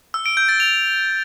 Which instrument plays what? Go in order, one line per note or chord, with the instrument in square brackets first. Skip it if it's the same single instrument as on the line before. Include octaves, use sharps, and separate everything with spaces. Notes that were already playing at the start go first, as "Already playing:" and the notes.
[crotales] E6
D7
G6
A6
F7